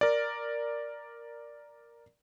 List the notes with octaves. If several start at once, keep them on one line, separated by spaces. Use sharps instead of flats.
A#4 D5